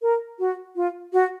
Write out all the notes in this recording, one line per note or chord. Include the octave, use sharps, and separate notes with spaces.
A#4
F#4
F4
F#4